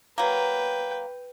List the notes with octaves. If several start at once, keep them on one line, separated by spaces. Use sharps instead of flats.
F#3 A#3 B4 G5